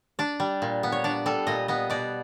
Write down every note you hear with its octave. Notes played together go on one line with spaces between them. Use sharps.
D4 D5
G3
A#2
B3
C#5
D4 D5
G3 A4
A#2 D#5
B3 D#5
B2 D5